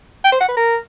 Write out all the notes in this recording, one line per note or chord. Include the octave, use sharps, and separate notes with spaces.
G5
C5
F#5
B4
A#4